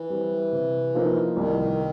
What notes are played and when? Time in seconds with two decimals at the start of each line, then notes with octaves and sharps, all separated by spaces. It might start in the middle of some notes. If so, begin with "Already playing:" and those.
Already playing: E3
0.10 G3 C4
0.52 C3
0.95 F3 A#3 D#4
1.37 C2 D#3